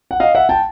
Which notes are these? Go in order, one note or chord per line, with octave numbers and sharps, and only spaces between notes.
F#5
D#5 F5
E5 F#5
G5 A5